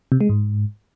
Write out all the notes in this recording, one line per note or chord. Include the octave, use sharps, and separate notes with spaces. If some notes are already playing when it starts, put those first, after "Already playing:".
C3
G#3
G#2